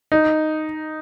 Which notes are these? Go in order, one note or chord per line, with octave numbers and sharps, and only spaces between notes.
D#4